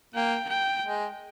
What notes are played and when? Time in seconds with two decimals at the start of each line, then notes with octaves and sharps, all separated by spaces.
0.14 A#3 G5
0.49 G5
0.85 G#3